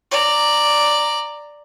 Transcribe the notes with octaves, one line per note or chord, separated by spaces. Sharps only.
D5 A#5